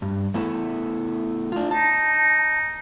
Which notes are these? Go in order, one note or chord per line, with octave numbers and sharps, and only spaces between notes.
G2
A3 B3 E4
D4 F4
D#4 A5